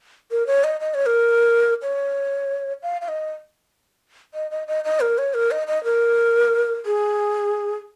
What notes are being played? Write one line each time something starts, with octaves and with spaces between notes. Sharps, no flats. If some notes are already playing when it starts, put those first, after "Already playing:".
A#4
C#5
D#5
D#5
C#5
A#4
C#5
F5
F5
D#5
D#5
D#5
D#5
D#5
A#4
C#5
A#4
D#5
D#5
A#4
G#4